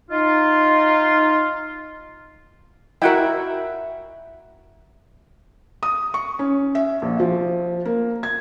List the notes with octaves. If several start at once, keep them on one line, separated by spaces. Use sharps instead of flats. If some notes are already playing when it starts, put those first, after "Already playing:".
D#4 F4
E4 F#4 A#4 E5 F#5 G5
D#6
C#6
C#4
E5
A#1
F3
A#3
G#6